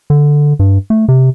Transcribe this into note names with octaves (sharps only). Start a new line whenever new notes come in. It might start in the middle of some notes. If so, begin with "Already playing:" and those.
D3
G2
A3
C3